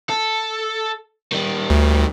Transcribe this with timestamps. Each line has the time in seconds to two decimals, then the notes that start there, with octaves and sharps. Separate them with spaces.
0.10 A4
1.32 D#3 G3
1.70 D2